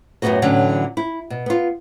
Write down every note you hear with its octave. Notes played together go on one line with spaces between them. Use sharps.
F#2 A2 F#3 B3 F#4 D#5
A2 D3 E3 F#3 C#4
E4
B2
B3 F4